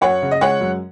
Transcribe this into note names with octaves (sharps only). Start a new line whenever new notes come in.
F#2 C#5 F#5
C#3
D#5
G#3 C#5 F#5
F#2